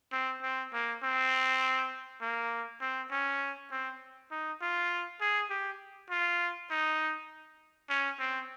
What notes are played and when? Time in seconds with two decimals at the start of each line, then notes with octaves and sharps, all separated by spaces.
0.12 C4
0.42 C4
0.73 A#3
1.03 C4
2.21 A#3
2.81 C4
3.11 C#4
3.71 C4
4.31 D#4
4.61 F4
5.21 G#4
5.50 G4
6.10 F4
6.71 D#4
7.89 C#4
8.19 C4